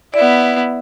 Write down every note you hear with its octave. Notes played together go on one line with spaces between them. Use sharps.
B3 E4 D5